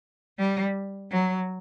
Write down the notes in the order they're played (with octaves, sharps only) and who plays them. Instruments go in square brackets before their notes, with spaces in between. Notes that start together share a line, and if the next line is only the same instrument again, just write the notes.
[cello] G3
F#3